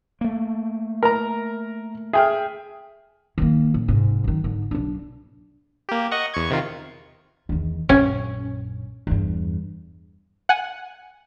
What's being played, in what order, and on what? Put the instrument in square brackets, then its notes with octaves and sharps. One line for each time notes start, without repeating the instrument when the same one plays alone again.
[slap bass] A3 A#3
[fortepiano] A#4 A#5
[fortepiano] G#4 [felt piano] E5 G5 F6
[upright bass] D#3 A#3
A#1
G#2 C3
F#2 D#3
G#2 D3
B1 D4
[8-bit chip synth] A#3 G4
D#5 F#5 C#6
E2 C#6 G#6
C3 D#3 F4
[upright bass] E2 D#3
[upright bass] A#1 F#2 [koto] C#4
[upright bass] E2 G2
[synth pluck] F#5 G#5